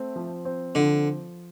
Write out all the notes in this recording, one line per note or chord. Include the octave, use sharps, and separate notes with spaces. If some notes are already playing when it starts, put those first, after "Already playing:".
Already playing: A3 C4
F3
C4
D3 F3